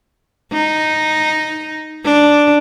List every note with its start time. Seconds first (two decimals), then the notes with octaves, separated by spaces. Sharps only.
0.52 D#4
2.05 D4